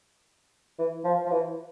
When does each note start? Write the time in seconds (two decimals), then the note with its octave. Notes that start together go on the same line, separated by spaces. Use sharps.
0.79 E3
1.04 F3
1.26 F3
1.31 E3